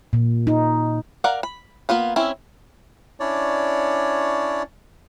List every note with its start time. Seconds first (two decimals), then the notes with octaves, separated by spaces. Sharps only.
0.13 A#2
0.47 D#4
1.24 A#4 D5 F5 F#5
1.43 B5
1.89 A#3 B3 F4 B5
2.16 C4 C#4 E4
3.20 C#4 D4 E4 C#5 D5